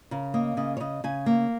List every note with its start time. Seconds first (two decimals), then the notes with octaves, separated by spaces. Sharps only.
0.11 C#3 A#4
0.34 A#3 D#5
0.57 C#3 D#5
0.77 C#5
0.80 C#3 D#5
1.04 C#3 G#5
1.26 A#3